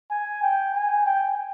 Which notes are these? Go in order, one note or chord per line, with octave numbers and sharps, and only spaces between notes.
G#5
G5
G#5
G5